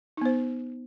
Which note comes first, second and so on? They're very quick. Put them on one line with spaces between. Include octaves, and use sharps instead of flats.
D#4 B3 C5